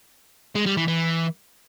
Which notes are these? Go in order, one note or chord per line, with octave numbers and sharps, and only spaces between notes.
G#3
G3
E3
E3